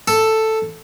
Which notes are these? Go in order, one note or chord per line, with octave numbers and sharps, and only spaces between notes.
A4